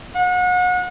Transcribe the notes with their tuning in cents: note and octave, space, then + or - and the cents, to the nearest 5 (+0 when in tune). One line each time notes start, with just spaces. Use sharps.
F#5 -35